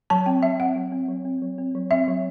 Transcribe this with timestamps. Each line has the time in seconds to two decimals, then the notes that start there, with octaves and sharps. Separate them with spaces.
0.10 F#3 A5
0.26 C4 G5
0.43 F#3 E5
0.60 C4 F#5
0.76 F#3
0.92 C4
1.09 F#3
1.25 C4
1.42 F#3
1.58 C4
1.75 F#3
1.91 C4 E5
2.08 F#3